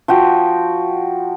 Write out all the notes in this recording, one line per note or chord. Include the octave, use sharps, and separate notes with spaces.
F3 F#4 G5